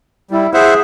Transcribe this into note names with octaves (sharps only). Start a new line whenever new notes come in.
G3 E4
G#4 C5 E5 F#5